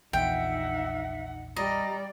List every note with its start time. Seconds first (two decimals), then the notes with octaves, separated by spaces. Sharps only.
0.13 A#1 E2 D#4 E5 F#5 G5
1.56 G3 D5 D#5 A#5